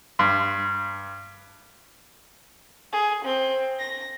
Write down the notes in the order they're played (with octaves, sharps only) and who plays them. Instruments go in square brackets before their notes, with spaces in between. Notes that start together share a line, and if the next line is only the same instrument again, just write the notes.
[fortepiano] G2
[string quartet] G#4
C4
A#6